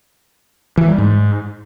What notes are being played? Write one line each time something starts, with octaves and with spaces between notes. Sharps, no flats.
E3
G3
G#2